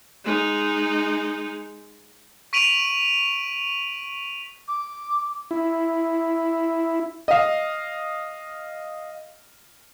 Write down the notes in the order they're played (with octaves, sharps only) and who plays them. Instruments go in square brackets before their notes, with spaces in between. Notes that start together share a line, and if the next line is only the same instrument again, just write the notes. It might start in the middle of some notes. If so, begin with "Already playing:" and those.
[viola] G#3 D#4
[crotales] C#6 B6 D7 D#7 F7 F#7
[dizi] D6
[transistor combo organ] E4
[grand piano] D#5 F5